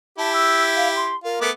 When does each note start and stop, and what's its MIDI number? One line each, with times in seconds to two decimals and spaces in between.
0.18 1.14 64
0.18 1.14 67
0.18 0.30 81
0.33 0.62 88
0.76 0.88 77
0.95 1.15 84
1.24 1.39 65
1.24 1.46 70
1.41 1.50 57
1.41 1.50 59
1.41 1.50 86